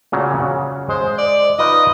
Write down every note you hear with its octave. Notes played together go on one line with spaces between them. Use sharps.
A#2 C#3 F#3
C#3 F#5
G#3 C5
D5
D#4 F4 B4 D#5